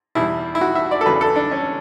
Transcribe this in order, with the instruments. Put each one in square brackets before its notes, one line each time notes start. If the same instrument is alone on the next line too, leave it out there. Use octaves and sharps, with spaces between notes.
[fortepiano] E2 B2 G3 E4
E4
F#4
E5
D5
A4
E2 C#3 F#3 B4
A4
D4
C#4